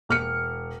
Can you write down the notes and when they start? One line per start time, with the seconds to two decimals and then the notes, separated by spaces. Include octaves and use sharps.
0.09 E1 F6 C#7